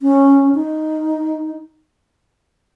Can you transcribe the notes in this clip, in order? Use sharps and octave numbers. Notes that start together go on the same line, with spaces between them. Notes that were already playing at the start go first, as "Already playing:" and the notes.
C#4
D#4